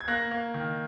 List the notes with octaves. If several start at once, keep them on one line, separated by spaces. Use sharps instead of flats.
G#6
A#3 F#6 A#6
A#3
D#3